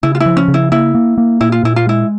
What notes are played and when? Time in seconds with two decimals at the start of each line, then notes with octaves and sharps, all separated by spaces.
0.03 C#3 E4
0.15 F4
0.20 E4
0.26 F3
0.37 C#4
0.48 C#3
0.54 E4
0.72 A#3 E4
0.95 A#3
1.18 A#3
1.41 A#2 E4
1.52 F4
1.64 A#2 E4
1.76 F4
1.87 G#3 E4